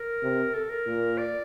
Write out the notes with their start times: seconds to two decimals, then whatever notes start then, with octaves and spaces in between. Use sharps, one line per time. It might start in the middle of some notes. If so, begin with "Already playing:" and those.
Already playing: A#4
0.23 C3
0.54 A4
0.70 A#4
0.86 A#2
1.18 D5